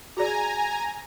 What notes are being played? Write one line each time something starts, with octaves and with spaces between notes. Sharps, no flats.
F#4 G#4 D5 G#5 A#5